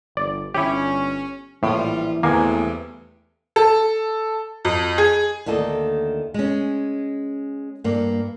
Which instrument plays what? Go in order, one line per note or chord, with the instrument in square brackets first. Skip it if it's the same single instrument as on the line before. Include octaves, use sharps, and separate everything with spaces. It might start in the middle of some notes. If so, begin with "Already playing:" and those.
[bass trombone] G1 [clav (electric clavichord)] D5
[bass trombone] G1 [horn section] C#4 [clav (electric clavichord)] E4 G4
[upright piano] A#1 [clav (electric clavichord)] A2 [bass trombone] E3 [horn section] G3 F4
[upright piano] E2 G#5 [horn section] G2 C3 [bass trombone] A3 [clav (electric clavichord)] A#3
[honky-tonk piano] A4
F2
G#4
[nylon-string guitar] D2 D#3 A#3 A4 D#5
G#3 C#4
G2 A#3